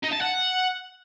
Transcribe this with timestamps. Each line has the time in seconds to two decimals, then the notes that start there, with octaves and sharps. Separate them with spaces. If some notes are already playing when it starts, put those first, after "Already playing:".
0.04 D#4
0.13 A5
0.22 F#5